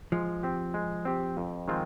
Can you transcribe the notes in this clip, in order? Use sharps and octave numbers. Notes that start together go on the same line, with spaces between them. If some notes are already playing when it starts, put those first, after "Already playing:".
F3 G#3
C4 G4
G#3
C4 G4
F2
D#3 G#3 C4 F4